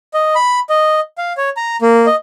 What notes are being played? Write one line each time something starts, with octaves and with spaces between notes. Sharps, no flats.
D#5
B5
D#5
F5
C#5
A#5
A#3
D#5